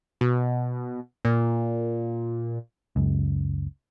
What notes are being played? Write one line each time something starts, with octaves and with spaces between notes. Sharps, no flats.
B2
A#2
F#1 C#2